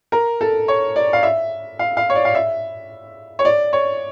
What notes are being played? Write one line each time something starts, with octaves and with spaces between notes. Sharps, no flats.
A#4
A4
C#5
D5
F5
E5
F5
F5
C#5
D5
F5
E5
C#5
D5
C#5